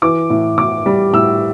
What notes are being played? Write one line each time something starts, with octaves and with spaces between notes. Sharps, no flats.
E3 D6
A2
A2 D6
G3
A2 E6